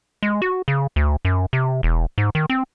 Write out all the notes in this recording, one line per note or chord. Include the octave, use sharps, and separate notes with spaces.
G#3
F#4
C#3
D2
F#2
C3
E1
G#2
D#3
C4